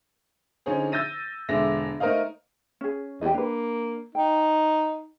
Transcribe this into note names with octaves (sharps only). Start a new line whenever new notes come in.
D3 F3 C#4 D#4 G#4
E6 G6 A6 A#6 D#7
E1 D3 G#3 D4 E5 A#6
A3 D#4 A#4 C5 D#5 F5
C#4 G#4
E2 G4 D#5
A#3 D4 B4
D#4 G5